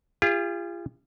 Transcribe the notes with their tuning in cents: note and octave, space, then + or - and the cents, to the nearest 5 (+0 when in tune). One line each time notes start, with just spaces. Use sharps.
F4 -30 G#4 -45